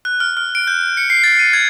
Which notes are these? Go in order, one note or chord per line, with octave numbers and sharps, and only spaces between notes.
F#6
F6
F6
D7
G6
C#7
C7
A6
D#7
G#6